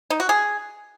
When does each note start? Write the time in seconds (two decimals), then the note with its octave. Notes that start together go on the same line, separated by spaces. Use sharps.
0.10 D#4
0.20 F#4
0.29 G#4